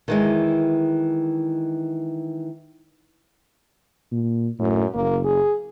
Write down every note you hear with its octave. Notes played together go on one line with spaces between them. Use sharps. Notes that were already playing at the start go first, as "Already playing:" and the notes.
D#3 E3 G#3
A#2
F#2 A2
F#1 A#3
G#4